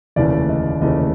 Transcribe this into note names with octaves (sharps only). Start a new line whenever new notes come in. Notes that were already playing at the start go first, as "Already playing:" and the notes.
F1 D#2 C#3 E3 A3 D5
D#5
F1 D#2 C#3 E3 A3 D#5